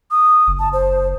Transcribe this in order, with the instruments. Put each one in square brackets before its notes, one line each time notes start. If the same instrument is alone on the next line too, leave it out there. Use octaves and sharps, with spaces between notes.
[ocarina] D#6
[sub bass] F#1
[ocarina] A5
C5